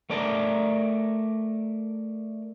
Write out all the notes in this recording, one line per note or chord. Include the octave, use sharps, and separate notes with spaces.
A3 A#4 D5 A5 A#5